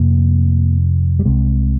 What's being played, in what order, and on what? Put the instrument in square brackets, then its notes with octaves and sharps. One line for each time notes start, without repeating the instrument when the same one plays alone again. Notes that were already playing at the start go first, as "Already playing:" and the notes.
Already playing: [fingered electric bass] F2 C3 A#3
G3
C2 C3 G#3